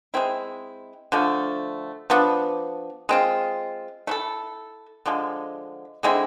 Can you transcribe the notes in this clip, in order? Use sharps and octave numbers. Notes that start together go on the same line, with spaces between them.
G#3 C4 E4
D3 F3 A3
F3 B3 D4
G#3 C4 F4
A3 E4 A4
D3 F3 G#3
D3 G#3 C4 E4